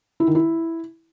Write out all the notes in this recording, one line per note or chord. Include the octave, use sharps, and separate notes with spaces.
E4
D#3
E4